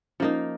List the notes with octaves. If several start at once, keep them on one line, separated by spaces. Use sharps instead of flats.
F3 A#3 C#4 D#4